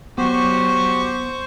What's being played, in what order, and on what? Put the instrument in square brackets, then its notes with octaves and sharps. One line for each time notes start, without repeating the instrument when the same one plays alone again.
[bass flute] F#3 [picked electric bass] B3 [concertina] F#4 G4 [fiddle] C5 C#6